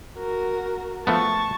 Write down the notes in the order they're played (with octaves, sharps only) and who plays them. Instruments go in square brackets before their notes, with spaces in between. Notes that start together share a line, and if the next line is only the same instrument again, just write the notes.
[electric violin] F#4 A#4
[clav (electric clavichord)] F3 A3 B3 [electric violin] A5 C#6